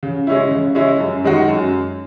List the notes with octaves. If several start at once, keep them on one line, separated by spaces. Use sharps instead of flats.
C#3
G#3 C#4 E4
C#3
G#3 C#4 E4
F#2
D#3 G#3 D#4 F#4
F#2